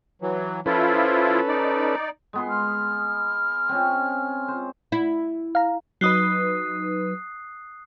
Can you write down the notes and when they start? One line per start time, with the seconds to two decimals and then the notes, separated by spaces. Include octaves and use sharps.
0.22 E3 F#3
0.66 F3 C#4 E4 F4 A4 B4
1.48 D#4 D5
2.33 G#3 B3 C6
2.49 F6
3.69 C4 C#4
4.48 C5
4.92 E4
5.55 F5 A#5
6.01 F#3 D#4 B4 D#6 F#6 C7